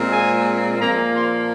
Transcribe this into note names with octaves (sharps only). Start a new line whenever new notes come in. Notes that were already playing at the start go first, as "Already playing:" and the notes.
Already playing: A#2 G#3 C4
G#5
A#2 F3 A#3 A#5
C6